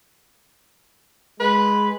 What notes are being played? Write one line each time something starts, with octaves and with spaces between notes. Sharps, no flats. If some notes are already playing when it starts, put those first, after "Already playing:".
G#3 B4